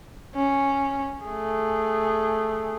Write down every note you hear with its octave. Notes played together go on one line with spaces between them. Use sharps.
C#4
A3 G#4